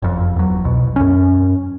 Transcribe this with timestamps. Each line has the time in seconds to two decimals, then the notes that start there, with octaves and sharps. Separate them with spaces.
0.02 F#1 F2
0.36 E2 F#3
0.64 C2 B2
0.96 F#2 C#4